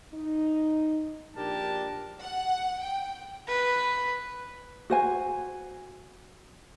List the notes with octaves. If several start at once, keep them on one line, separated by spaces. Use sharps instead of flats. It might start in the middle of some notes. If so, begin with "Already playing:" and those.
D#4
A#1 D4 G4 A#4 A5
F#5
G5
B4
F#4 C5 G#5